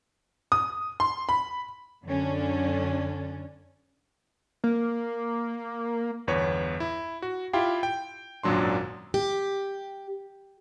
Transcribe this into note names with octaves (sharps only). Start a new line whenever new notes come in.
D#6
C6
B5
F#2 D3 C#4 D4
A#3
G1 E2 B4 C#5
E4
F#4
E4 F4 G4 F5 G5
G5
G#1 F#2 A#2 F#3 D4 C6
G4